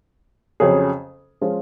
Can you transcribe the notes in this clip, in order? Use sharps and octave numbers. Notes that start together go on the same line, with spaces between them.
F2 C#3 F#3 C#4 G#4
F3 G#3 C#4 F4 G#4